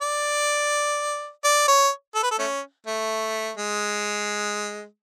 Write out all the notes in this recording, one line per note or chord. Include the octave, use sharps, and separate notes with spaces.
D5
D5
C#5
A4
B4
A4
A3 C#4
A3
G#3